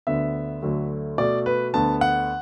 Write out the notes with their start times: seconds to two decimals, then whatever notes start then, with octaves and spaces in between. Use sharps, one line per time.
0.07 D2 D3 B3 E5
0.62 D2 D3 F#3 A3
1.18 B2 A3 D5
1.46 B4
1.74 D2 D3 B3 A5
2.01 F#5